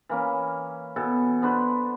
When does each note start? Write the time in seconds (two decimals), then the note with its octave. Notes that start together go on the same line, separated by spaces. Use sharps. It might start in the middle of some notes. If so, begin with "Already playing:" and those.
0.09 E3 A#3 C#4
0.96 B2 E3 A4
1.42 B3 D4 B4 C5